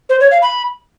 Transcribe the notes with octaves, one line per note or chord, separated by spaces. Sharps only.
C5
C#5
F5
B5